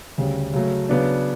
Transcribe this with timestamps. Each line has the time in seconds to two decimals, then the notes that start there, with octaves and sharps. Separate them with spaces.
0.18 D2 C#3 G3 C#4
0.53 C#3 F#3 A3
0.89 C#3 F#3 B3 D4